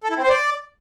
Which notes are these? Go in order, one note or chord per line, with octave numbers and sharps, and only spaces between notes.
A4
E4
C4
C5
D5